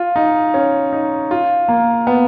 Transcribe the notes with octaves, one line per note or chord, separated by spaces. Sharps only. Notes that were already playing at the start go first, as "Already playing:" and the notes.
Already playing: F4
D#4
C#4
D#4
F4
A#3
B3